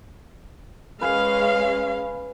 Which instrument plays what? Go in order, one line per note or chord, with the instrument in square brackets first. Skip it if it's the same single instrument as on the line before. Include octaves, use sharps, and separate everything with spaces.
[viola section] G#3 C#4 F5 [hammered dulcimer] B4 G#5